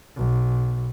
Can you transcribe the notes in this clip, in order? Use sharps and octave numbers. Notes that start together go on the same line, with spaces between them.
B1